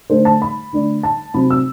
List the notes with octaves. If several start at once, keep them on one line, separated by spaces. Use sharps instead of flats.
D3 A3 D4 C5
A5
B5
D3 A3 D4
A5
C3 F#3 C4 B5
E6